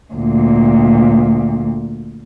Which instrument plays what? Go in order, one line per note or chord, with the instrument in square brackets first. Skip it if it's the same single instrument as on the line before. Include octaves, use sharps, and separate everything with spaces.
[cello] D2 A#2